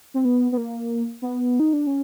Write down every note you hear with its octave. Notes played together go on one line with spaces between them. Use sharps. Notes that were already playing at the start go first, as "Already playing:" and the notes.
C4
B3
B3
A#3
B3
D#4
D4
C#4